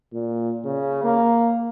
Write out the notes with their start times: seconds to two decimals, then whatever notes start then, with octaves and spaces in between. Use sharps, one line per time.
0.13 A#2
0.65 C#3
1.03 A#3